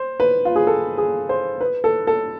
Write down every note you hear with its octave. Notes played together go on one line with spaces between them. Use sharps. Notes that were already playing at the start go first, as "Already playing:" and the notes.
Already playing: C5
B4
F4
G#4
A4
G#4
C5
B4
A4
A4